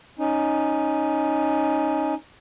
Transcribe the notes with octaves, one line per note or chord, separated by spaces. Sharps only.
C#4 D#4